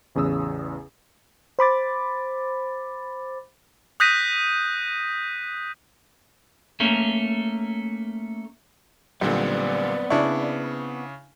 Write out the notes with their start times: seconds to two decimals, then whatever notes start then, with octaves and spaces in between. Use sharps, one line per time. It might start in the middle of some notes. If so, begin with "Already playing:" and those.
0.15 A1 E2 C#3 D#6 E6
1.59 C5 B5 D6 A6
4.00 D#6 F#6 G6 A#6 B6 D#7
6.80 A3 A#3 C#4
9.21 B1 A#2 D3 G3 B3 C4 D5
10.10 C#3 D4 E4 C#6